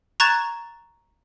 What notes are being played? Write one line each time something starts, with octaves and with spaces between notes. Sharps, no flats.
A#5 C#6 F#6 G#6 A6 E7